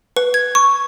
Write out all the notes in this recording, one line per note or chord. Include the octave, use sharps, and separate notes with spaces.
B4
G#6
C#6